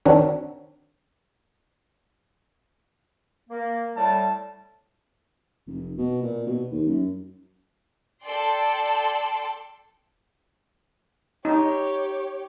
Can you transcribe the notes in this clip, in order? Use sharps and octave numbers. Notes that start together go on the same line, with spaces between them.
D#3 C4 D4 F#4 A#4 C#5
A#3
A2 G3 A5
F1
B2
A#2
B2
D#2
F#2
A4 D5 G5 C6
D#4 G4 C#5